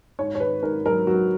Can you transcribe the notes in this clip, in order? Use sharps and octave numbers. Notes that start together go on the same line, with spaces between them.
G#2 C#5
C#5
D#3 B4
G#2 A#4
F#3 A#4
F#3 F#4